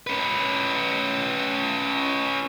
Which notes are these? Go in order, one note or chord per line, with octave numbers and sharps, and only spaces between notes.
C#4 B4